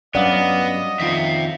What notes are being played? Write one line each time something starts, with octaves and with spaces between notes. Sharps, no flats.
G2 F#3 B3 C#4 D5 D#5 F5 F#5
F2 D#3 F4 E5 G5